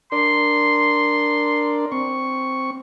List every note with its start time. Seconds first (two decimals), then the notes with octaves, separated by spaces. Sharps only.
0.12 D4 A#4 D5 C6
1.92 C4 C#6